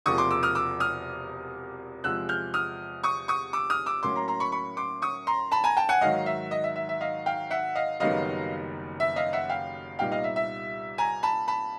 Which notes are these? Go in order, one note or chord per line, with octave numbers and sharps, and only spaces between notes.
E1 E2 C3 F3 A#3 C#6 D#6
C6 D6
D6 E6
D#6 F6
D6 E6
D#6 F6
E2 C3 F3 G#3 E6 F#6
F6 G6
D#6 F6
C#6 D#6
C#6 D#6
D6 E6
D#6 F6
D6 E6
A2 F#3 A#3 C#4 C6 D6
A#5 C6
A#5 C6
B5 C#6
B5 C#6
C6 D6
C#6 D#6
A#5 C6
A5 B5
G#5 A#5
G5 A5
F#5 G#5
G#2 D#3 F#3 D#5 F5
E5
D#5
E5
E5
E5
D#5 F5
F5 G5
E5 F#5
D#5 F5
F#1 F#2 D#3 G3 B3 D#5 F5
E5
D#5 F5
E5 F#5
F5 G5
C2 A#2 G3 B3 D#4 F5 G5
D#5 F5
E5
E5
G#5 A#5
A5 B5
A5 B5